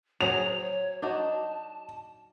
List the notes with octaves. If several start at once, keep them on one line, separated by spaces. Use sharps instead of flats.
F#3 G#4 C5 F7
C#5
D4 D#4 F#4 A5